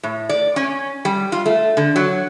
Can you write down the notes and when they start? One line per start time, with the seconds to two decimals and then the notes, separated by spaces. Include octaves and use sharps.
0.03 A2
0.29 D5
0.56 C#4
1.05 G3
1.32 F4
1.46 A3
1.77 D3
1.96 F#3